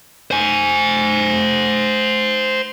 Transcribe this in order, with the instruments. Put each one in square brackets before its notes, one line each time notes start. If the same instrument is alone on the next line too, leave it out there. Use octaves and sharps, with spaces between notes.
[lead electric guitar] C5 G#5